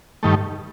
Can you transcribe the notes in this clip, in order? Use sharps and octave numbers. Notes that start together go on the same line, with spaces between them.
G2 D#3 A3